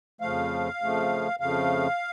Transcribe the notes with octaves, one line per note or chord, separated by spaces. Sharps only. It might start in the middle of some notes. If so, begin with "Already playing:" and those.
F2 C#3 F3 A3 F5
F2 C#3 F3 A3
F2 C#3 F3 A3 F5